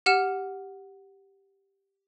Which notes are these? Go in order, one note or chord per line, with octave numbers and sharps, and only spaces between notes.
G4 F#5 F6 E7